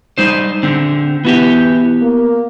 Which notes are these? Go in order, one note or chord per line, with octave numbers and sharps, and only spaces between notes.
G3 D#4 C5
D3 C4
E3 B3 F#4 G4
A#3